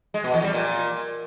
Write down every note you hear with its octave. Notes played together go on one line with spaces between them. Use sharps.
G#3
B2
E2
G3
A#2